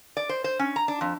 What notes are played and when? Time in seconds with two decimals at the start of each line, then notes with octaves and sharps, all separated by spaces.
0.17 D5
0.29 C5
0.44 C5
0.59 C#4
0.76 A#5
0.88 D4
1.01 F2